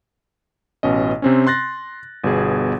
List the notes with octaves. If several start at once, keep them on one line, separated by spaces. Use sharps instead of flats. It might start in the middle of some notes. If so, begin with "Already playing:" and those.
A1 B2 C#4 D#5
C3 C4 C#4
C6 F#6 A6 A#6
G1 B2 G#4